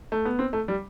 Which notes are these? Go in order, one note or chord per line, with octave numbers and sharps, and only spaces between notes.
A3
B3
C4
A3
G3